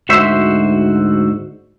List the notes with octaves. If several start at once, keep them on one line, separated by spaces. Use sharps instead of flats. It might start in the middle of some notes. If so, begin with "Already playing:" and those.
D2 G#2 F#4 C5 E5